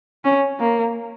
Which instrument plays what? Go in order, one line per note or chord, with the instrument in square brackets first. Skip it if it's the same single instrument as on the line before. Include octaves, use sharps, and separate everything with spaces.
[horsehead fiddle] C#4
A#3